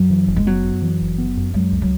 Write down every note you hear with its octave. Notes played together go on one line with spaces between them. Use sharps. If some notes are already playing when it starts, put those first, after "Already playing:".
Already playing: F#2 F#3
E3
F#1
G#3
F#3 B3
F#2
E3
F#1
B3
F#2
F#3 G#3
C#2
F#3